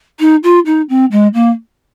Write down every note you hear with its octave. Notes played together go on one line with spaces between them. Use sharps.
D#4
F4
D#4
C4
G#3
A#3